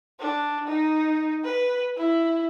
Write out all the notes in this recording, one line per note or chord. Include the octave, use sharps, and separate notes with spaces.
D4
D#4
B4
E4